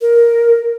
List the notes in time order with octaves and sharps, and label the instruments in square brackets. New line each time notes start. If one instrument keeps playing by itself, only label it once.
[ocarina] A#4